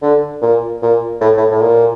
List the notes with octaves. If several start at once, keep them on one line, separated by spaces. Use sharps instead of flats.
D3
A#2
A#2
A2
A2
A2
A#2